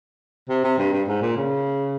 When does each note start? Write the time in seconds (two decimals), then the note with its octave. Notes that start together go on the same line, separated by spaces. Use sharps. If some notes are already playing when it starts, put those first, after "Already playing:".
0.49 C3
0.64 C3
0.78 G2
0.93 G2
1.08 G#2
1.22 A#2
1.37 C#3